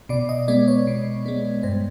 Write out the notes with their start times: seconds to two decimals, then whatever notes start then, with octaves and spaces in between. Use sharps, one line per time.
0.09 B2 D5
0.29 D#5
0.48 G#3 B3 D5
0.68 C#5
0.87 B2
1.26 G#3 B3
1.63 G2 C5